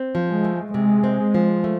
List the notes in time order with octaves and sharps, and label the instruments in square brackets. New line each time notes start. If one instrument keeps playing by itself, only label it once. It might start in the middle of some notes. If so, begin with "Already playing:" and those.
Already playing: [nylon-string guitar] C4
F3
[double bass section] G#3
[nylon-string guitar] A3
[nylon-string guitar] C3 [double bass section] G#3
[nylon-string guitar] C4
F3
A3